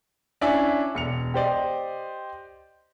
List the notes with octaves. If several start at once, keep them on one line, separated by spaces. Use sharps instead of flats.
C#4 D4 E4 D5 E5 G#5
E1 C#7 F7
G4 C5 D5 D#5